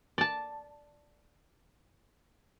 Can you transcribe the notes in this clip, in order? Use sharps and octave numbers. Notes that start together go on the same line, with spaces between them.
D5 A5